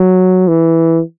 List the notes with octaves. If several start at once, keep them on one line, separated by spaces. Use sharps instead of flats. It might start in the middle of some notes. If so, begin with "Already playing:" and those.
Already playing: F#3
E3